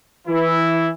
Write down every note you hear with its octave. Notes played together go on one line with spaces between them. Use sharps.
E3 E4